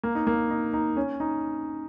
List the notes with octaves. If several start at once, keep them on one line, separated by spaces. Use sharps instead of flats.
A#3
D#4
A#3
D#4
D#4
C#4
D#4